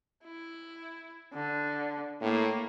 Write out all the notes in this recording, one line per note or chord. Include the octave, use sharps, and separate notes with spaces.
E4
D3
A2 A#3